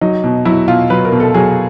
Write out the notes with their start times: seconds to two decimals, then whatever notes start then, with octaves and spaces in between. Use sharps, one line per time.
0.01 F#3 D#4
0.24 B2
0.45 F#3 E4
0.68 B2 F4
0.90 F#3 B4
1.05 A#4
1.12 B2
1.20 A4
1.34 F#3 G#4